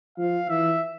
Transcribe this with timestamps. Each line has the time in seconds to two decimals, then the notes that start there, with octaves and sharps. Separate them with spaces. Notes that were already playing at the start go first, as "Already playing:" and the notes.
0.18 F3 F5
0.49 E3 E5